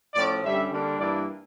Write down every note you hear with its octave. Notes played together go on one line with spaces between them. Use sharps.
A2 F3 C#4 D5
G2 D3 G3 C#4 E5
D3 G3 A#3 D4
G2 E3 A#3 D4 D5